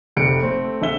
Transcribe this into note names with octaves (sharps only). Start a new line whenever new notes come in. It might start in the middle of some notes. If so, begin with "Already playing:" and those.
F1 C3 C#7 D7
A3 C4
A#1 D3 E5 G7